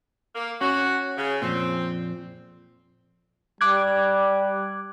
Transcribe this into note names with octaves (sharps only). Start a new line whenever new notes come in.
A#3
C#4 F#4
C#3
F2 A#2 C4
G3 D6 F#6 G#6